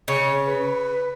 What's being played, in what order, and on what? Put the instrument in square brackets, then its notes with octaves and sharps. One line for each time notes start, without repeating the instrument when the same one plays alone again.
[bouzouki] C#3 [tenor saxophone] C#5
[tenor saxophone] B4